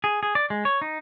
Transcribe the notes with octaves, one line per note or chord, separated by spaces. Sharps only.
G#4
G#4
D5
G#3
C#5
D#4